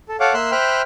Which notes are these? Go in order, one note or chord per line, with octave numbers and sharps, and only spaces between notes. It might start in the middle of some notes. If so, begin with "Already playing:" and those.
A4
A4 C#5 F5 F#5 D6
A#3 E5 C6 E6 F#6
C5 E5 G5 B5 F6 F#6